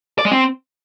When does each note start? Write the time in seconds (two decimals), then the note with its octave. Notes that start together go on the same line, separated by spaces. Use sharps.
0.19 D5
0.25 G#3
0.32 C4